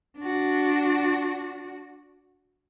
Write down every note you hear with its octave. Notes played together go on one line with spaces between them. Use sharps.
D4 F#4